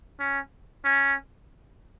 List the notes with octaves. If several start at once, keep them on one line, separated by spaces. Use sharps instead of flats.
C#4
C#4